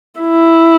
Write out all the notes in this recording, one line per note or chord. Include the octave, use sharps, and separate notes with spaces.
E4